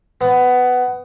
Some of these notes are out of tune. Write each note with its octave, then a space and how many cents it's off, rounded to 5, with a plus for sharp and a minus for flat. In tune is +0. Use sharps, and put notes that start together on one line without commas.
B3 +15